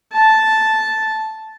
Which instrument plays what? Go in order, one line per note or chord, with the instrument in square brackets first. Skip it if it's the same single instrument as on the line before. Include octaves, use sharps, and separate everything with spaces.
[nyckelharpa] A5